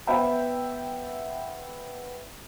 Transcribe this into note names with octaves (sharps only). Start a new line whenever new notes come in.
B3 B4 C5 E5 G5 B5